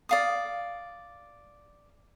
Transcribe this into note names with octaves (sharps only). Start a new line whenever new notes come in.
D5 F5 D#6